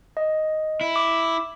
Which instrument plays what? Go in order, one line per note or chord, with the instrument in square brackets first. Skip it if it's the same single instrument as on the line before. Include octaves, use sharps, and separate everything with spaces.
[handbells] D#5
[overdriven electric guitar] E4
[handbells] D6